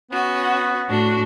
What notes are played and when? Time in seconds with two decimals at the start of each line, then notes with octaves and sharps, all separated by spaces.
0.11 B3 C#4 F#4
0.89 A2 D4 F#4